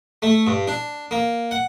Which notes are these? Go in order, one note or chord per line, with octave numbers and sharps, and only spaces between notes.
A3
G2
D4
A#3
F#5